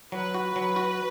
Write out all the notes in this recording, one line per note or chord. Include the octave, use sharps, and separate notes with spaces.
F#3 B4
F#4
F#3
F#4